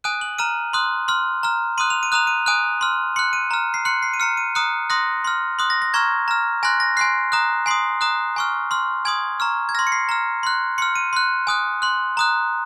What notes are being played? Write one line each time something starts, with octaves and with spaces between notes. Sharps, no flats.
G#5 D#6 F#6 D#7
F#7
A#5 F6 D#7
C6 D#6 F#6
C6 F6
A#5 F6
C6 D#6 F#6 D#7
F7
D#7
A#5 D#6 F#6 F7
D#7
G#5 D#6 F#6 D#7
C6 F6
C6 F#6 C#7
D#7
A#5 F6
C7
C6 F#6 C#7
C7
D#7
A#5 F6 C#7
D#7
A#5 D#6 F#6 C#7
C6 D#6 F#6 A#6
C6 F6
C6 D#6 F#6
A#6
A#6
A#5 C#6 F6 G#6
A#5 F6
G#5 C6 F#6 A#6
A#6
G#5 C6 F#6 C7
A#5 D#6 F#6
G#5 C6 D#6 C7
A#5 D#6 F#6
G#5 C#6 F6
C6 F6
G#5 C6 D#6 G#6
A#5 C#6 F6
G#6
C6 F6 A#6
C#7
C7
A#5 F6
C6 F#6
C6 F6 C#7
D#7
C6 F#6
G#5 D#6 F#6
C6 F#6
A#5 D#6 F#6